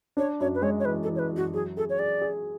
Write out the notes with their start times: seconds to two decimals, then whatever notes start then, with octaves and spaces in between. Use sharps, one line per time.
0.17 D4 C#5
0.40 F#2 C#5
0.55 B4
0.62 G#3 C#5
0.80 C#5
0.85 E3 B4
1.03 A4
1.08 E3
1.16 C#5
1.19 B4
1.32 F#2 F#4
1.54 F#3 G#4
1.77 G#4 A4
1.90 C#5
1.99 G#4 D5
2.22 G#4